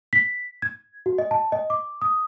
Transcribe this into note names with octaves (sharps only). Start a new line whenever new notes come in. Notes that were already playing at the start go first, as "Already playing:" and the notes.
B6
G#6
F#4
D#5
A5
D#5
D6
D#6